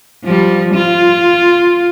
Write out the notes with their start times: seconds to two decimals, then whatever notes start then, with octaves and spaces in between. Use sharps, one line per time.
0.24 F3 G3
0.74 F4